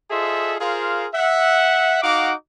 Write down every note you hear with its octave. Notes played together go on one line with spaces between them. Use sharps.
F4 G#4 A4 C5 D#5 E5
F4 G#4 A#4 C5 F5
E5 F#5
D#4 F#4 F5 F#5 D6